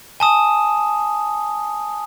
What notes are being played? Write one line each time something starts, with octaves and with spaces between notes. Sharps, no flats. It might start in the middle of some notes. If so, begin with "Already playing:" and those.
G#5 A5 D#6